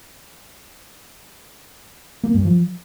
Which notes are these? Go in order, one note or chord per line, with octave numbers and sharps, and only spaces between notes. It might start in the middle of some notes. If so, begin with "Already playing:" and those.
A#3
G2
F3